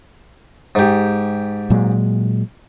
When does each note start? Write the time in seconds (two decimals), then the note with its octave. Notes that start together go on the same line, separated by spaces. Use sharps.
0.75 G#2 G4
1.70 A#2 F#3 G#3